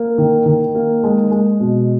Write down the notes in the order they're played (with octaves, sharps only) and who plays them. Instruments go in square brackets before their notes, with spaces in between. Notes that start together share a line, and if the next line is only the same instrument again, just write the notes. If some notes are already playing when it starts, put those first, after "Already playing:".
Already playing: [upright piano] A#3
D#3
D#3
A#3
G#3
G#3
B2